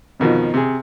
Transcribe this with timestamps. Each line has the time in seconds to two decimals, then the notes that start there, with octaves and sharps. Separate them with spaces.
0.20 F2 B2 D#3 F3
0.54 C3 G#4